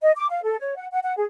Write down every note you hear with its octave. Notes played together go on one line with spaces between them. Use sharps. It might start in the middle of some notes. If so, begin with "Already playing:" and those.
D#5
D6
F5
A4
C#5
F#5
F#5
F#5
G#4